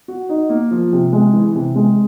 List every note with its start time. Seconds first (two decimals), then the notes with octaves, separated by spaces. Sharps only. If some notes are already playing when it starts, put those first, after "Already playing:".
0.08 F#4
0.29 D#4
0.49 A#3
0.71 F3
0.93 C3
1.13 G#3
1.33 E3
1.55 C3
1.76 G#3